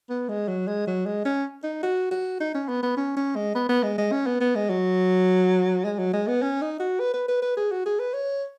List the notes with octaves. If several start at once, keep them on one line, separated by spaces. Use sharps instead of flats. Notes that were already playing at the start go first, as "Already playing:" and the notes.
B3
G#3
F#3
G#3
F#3
G#3
C#4
D#4
F#4
F#4
D#4
C#4
B3
B3
C#4
C#4
G#3
B3
B3
G#3
G#3
C#4
B3
B3
G#3
F#3
G#3
F#3
G#3
B3
C#4
D#4
F#4
B4
B4
B4
B4
G#4
F#4
G#4
B4
C#5